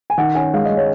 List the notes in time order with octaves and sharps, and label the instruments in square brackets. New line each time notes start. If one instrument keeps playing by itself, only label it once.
[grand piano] G#5
[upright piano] D#3 [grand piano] F#5
[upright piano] C#4 [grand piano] G#5
[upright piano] G#3 [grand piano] F5
[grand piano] D#5
[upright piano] G#3
[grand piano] C#5